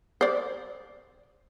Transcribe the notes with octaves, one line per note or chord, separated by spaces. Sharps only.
C5 D5